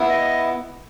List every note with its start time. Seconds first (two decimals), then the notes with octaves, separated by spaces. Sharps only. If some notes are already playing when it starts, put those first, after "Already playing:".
Already playing: B3 E4
0.09 D#5